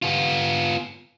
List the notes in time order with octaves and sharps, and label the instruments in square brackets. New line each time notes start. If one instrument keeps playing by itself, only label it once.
[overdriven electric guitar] B3 F4